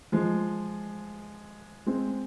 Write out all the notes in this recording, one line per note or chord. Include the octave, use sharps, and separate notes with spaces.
F3 G#3
G#3 C4